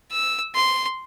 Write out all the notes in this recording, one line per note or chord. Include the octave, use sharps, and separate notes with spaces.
E6
C6